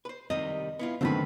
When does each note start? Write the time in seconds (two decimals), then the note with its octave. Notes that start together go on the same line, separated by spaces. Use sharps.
0.05 B4 C5
0.30 C3 D#3 G3 D#5
0.79 B3 E4 F4
1.01 C#2 F#2 B2 D3 D#3 A3 C4 B4